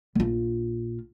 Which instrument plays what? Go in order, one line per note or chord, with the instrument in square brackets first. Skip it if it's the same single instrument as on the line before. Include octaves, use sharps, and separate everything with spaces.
[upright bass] A#1 F4